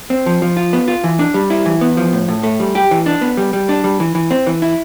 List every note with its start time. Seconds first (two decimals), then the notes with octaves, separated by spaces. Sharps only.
0.10 C4
0.26 F3
0.42 F3
0.57 F4
0.73 B3
0.88 F4
1.04 E3
1.19 D4
1.34 G3
1.50 E4
1.66 E3
1.81 B3
1.97 F3
2.13 A2
2.28 A2
2.44 A3
2.60 G3
2.75 G4
2.91 E3
3.06 D4
3.21 B3
3.37 G3
3.53 G3
3.69 D4
3.84 G3
4.00 E3
4.15 E3
4.31 C4
4.47 E3
4.62 E4